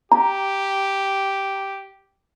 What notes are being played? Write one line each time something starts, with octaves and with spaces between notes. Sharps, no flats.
G4 A#5